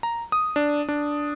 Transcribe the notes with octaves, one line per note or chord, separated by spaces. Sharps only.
A#5
D#6
D4
D4